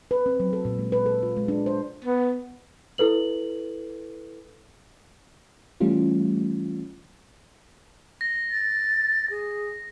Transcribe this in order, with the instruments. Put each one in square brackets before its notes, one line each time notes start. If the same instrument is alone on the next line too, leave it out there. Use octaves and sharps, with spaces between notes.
[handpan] B4
C4
F#3
A4
A#2
G#3
B4
A4
F4
G#3
D4
C5
[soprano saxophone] B3
[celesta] E4 A4 B4 F#7
[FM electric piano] E3 G3 A3 C#4 F4
[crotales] A#6
[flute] A6
G#4